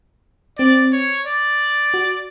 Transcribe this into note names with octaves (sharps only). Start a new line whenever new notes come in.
C4 D5
C#5
D5
F#4